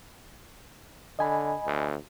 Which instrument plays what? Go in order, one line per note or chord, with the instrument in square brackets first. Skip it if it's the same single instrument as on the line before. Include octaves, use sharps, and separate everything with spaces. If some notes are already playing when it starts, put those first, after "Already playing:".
[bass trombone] D3 [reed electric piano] D#5 G#5 B5
[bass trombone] D2